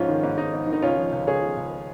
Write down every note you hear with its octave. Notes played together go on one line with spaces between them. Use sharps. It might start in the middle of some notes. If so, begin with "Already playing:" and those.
Already playing: G#2 F3 C#4 F4
D#3
G#2
G#2 D#4
G#2
D#3
D#4
C#2 C#4 F4
F3
C#2
C#2 G#4 C#5
F3
C#2